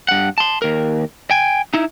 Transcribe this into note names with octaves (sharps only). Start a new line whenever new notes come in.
G2 F#5
A5 C6
D#2 A#4
G5 G#5
D#4 E4